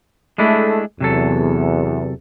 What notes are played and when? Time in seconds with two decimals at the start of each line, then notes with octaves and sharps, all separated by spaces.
0.38 G#3 A3 D4 E4
1.00 E2 C3 F#3 A4